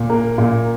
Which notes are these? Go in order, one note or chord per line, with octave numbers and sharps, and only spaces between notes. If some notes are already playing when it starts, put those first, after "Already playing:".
Already playing: A#2
A#3
A#2